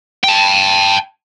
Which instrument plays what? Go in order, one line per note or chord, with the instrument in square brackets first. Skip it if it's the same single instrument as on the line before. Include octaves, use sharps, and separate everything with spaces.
[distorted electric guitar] G5 A5